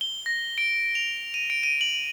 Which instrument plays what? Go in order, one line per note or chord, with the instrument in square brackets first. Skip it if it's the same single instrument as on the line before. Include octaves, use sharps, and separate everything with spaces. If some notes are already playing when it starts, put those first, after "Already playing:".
[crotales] G7
A#6
D7
F7
D#7
D7
D#7
F#7